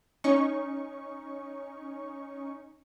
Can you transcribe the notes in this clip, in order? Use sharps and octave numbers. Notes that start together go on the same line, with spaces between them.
C#4 D#4 C#6